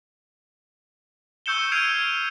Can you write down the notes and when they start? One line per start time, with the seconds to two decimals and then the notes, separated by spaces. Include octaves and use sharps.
1.46 C#6 E6 G6 C#7 E7 G7
1.72 F6 G#6 C7 D7 D#7 F7